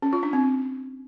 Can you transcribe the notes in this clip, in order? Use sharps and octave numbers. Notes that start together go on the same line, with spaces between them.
C#4
F4
D4
C4